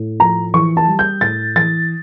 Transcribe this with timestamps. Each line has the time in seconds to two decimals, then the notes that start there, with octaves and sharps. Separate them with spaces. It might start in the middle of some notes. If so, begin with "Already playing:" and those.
Already playing: A2
0.20 F3 A#5
0.54 E3 C#6
0.77 A5
0.88 G3
0.99 G6
1.21 A2 A6
1.55 E3 A6